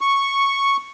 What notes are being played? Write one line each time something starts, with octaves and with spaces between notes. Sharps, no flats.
C#6